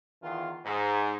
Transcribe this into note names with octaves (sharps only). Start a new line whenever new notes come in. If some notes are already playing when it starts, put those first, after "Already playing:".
E2 D#3 E3 F4
G#2